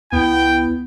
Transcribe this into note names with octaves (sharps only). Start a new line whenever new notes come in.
C#2 B3 E4 G5